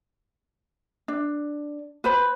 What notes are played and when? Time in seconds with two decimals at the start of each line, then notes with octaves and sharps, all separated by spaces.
1.08 D4
2.04 B4 C5 B5